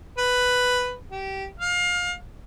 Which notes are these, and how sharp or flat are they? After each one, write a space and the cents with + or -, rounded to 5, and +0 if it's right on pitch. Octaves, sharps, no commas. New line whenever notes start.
B4 +5
G4 -20
F5 +25